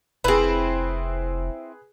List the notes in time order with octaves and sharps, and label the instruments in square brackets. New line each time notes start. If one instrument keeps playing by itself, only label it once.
[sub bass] F1 [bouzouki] C4 E4 [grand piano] G#4 B4